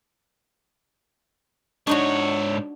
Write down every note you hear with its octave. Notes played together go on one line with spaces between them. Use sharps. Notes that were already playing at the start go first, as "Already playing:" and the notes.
G#2 D4 D#4 F#4 C#5